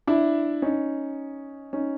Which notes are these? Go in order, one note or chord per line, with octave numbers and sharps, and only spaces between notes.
D4 E4
C#4 D#4
C#4 D#4